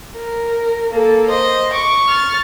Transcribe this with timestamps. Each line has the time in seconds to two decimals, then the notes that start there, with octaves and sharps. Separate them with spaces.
0.16 A#4
0.91 A#3 A4
1.30 C5 D#5
1.73 C#6 D6
2.08 F6 A6